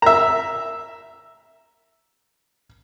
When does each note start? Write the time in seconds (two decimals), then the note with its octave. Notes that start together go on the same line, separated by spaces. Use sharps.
0.02 E5 A#5